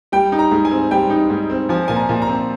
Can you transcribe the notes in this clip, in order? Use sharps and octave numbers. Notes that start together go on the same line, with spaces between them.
G3 G5
D#4
A#5
G#2
G#5
C4
G3 G5
D#4
G#2
C4
F3 G#5
A#2 G#5
A#5
A#2
A#5
C4